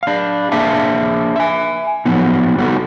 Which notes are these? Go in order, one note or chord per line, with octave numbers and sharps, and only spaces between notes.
D4 F5
A#3 D4 G#4 E5 F5 A5
E5 G#5
F3 F#3 B3 D#4
G3 B3 D#4 F#4 A4